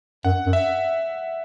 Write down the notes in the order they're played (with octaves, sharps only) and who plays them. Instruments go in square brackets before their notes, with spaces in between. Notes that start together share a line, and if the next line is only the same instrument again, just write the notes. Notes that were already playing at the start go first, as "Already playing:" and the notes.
[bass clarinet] F#2 [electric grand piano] F#5
[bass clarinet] F#2
[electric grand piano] E5